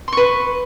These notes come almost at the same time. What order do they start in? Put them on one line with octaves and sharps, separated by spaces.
C6 C#6 B4